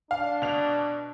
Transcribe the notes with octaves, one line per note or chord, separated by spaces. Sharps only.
D4 F5
B2 F7